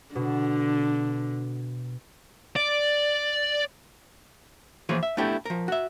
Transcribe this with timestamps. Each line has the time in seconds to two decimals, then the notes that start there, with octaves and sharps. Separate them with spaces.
0.15 B2 D3
2.56 D5
4.89 E3 F3 A#3 G#4 B4 C#5
5.03 E5
5.17 A3 B3 D4 E4 G4 A4
5.45 F3 A#4
5.68 F#4 E5